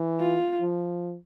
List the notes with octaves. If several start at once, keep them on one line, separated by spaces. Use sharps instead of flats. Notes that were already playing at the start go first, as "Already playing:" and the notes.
Already playing: E3
F4
F3